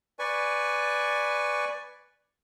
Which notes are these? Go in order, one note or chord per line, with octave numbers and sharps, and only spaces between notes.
B4 D5 G#5 C#6